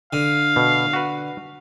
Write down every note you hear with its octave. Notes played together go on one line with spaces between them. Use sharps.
D3 F5
B2
F#4 B4